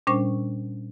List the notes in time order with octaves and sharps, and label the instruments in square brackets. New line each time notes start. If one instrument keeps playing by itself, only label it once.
[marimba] A#2 G3 C#4 D4 C5 C#6